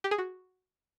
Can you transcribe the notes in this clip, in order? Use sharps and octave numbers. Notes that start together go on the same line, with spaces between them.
G4
G#4
F#4